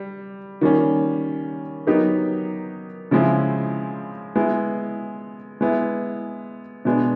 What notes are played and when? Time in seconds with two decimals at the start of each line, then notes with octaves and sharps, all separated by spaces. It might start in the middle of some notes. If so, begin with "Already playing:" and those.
Already playing: G3
0.61 D#3 G3 A#3 C#4
1.87 F#3 B3 D#4 G4 A#4
3.11 C#3 F3 G#3 C4 E4
4.36 G#3 B3 E4
5.61 G#3 B3 E4
6.85 B2 G#3 B3 D4